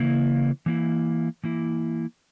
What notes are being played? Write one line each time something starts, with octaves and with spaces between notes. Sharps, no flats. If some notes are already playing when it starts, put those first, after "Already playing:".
Already playing: C#3 E3 A#3 E4
E3 A#3 E4
E3 A#3 E4